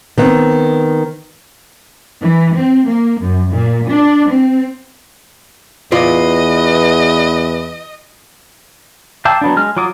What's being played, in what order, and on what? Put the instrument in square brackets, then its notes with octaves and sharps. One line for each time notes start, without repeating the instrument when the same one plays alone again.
[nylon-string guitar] D#3 B3 C4
[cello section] E3
C4
A#3
F#2
A#2
D4
C4
[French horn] E2 [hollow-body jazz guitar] F4 D5 [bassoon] B4 [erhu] D#5
[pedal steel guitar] F5 G5 A5 D6 E6
F#3 B3 D4
G#3 F6
F#3 F4 D6 D#6